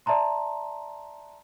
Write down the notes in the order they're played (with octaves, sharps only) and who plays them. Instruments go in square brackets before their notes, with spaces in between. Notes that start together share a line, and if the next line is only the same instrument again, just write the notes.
[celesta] D5 E5 A5 A#5 C6